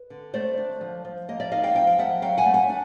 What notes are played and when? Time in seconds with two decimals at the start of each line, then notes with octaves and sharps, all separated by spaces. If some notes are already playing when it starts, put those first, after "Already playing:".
Already playing: B4
0.10 D3
0.34 A3 C5 D5
0.58 D4
0.81 F3
1.05 F3
1.28 A#3 D#5
1.40 D5 E5
1.52 D#4 D#5 F5
1.63 F5 G5
1.75 F3 F5 G5
1.87 G5
1.98 F3 E5 F#5
2.22 F#3 F5 G5
2.38 F#5 G#5
2.45 A3
2.54 F#5 G#5
2.69 D4